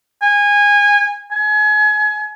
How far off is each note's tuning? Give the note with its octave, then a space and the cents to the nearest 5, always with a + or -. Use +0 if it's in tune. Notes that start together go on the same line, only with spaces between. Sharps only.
G#5 -20
G#5 +30